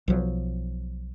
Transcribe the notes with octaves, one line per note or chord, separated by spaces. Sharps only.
B1 F3 F#3